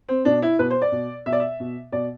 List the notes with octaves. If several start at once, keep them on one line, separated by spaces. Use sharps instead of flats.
C4
B2 D4
E4
B2 B4
C5
D5
B2
B2 E5
D5
E5
B2
B2 D5